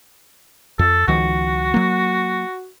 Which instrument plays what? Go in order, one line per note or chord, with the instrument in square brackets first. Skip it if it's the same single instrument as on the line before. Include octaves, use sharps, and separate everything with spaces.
[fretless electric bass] F2 [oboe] A4
[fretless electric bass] C#2 D#3 F3 [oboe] F#4
[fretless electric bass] F#3 A#3